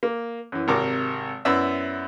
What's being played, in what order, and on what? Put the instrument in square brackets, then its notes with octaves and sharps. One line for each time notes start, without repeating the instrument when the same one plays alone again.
[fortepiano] A#3
F#2 E3
G#1 C3 A#4 D6
F#2 B3 E4 D5 E5 E6